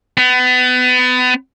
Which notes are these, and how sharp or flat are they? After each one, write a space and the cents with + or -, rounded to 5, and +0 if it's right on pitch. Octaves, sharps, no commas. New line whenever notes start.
B3 +30